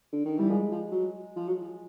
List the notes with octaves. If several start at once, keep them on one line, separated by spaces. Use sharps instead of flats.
D3
D#3
E3 G3
F3 G#3
F3
F#3
F3
F#3
F3